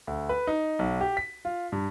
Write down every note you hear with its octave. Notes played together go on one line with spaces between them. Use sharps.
D2
B4
D#4
B1
G4
B6
F4
G2